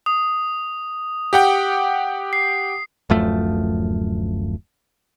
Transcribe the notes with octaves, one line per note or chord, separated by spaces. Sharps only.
D#6
G4 F#5 G5
C7
D1 F#2 F3 A3